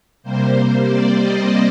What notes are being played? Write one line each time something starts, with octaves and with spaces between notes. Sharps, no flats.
C3 G3 A#3 C5
D5
D#5